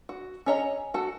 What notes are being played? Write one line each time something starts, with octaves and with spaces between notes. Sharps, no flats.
F#4
C#4 G#4 C#5 D#5 A#5
F#4 A4